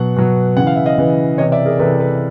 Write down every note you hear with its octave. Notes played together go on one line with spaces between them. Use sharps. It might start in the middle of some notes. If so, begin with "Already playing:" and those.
Already playing: B2 F#3 F#5
B2 F#3
C#3 E3 F#5
F5
E5
D#5 F5
C#3 E3
C3 E3 C#5 D#5
D5 E5
G#4 A#4
C3 E3 A4 B4
A4 B4